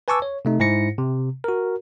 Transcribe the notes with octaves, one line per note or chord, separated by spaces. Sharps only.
B4 G#5 A5 C#6 D6 E6
C#5
C3 A3 D#4
G#2 E4 C5 A#6 C#7
C3
F#4 A#4